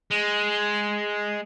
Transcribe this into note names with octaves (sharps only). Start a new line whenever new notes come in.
G#3